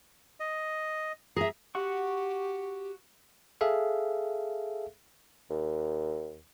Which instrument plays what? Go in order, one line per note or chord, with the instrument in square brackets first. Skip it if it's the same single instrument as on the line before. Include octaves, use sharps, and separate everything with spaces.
[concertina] D#5
[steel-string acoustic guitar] G#4 E5 [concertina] A#5
[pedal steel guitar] F#4 F#5 C#6 [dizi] G4
[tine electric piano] G#4 A4 E5 F5
[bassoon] D#2